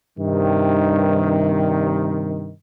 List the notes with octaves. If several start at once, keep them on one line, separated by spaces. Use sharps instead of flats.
G2 C3 D#3